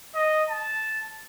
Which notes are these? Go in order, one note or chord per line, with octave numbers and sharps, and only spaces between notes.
D#5
A5